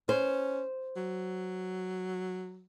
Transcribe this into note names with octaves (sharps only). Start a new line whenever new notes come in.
C#4 C5
F#3